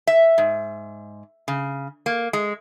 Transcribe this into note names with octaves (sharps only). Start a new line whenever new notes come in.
E5
G#2
C#3
A#3
G#3